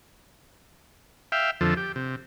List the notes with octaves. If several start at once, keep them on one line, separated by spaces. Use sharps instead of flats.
E5 F5 G5
F2 D3 F3 A4
G4
C3